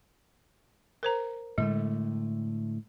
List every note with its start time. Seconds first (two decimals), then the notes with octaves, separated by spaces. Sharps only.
1.03 A#4 C5 A#5
1.58 A2 D3 G#3 A3